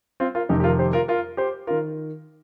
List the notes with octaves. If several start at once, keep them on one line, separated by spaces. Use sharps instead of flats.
C4 F4
F4 A#4
F1 F2 C3 D#3 D#4 G4
G4
F4 A#4
G4 C5
F4 A#4
F4 A#4
G4 C5
D#3 F4 A#4